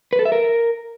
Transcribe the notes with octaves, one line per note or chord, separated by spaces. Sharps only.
B4
A4
E5
A#4